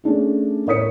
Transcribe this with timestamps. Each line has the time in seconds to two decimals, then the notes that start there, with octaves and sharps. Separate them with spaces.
0.04 A3 C#4 D4 G#4
0.66 A2 A#4 C#5 D#6 B6 C#7